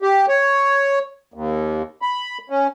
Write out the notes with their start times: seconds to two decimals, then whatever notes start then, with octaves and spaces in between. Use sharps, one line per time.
0.02 G4
0.29 C#5
1.34 D#2
2.02 B5
2.50 C#4